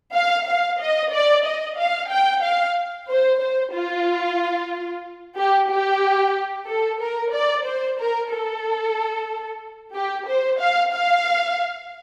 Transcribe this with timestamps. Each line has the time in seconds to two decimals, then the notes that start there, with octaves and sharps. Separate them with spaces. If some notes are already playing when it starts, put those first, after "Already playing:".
0.14 F5
0.47 F5
0.80 D#5
1.12 D5
1.45 D#5
1.78 F5
2.10 G5
2.43 F5
3.09 C5
3.41 C5
3.73 F4
5.37 G4
5.70 G4
6.68 A4
7.00 A#4
7.33 D5
7.65 C5
7.99 A#4
8.31 A4
9.94 G4
10.27 C5
10.59 F5
10.92 F5